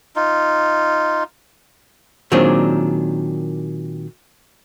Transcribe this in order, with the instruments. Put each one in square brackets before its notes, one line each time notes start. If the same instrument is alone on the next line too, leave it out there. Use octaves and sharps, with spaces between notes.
[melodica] D#4 F4
[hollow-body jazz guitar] A#2 D#3 F#3 C4 D4 G#4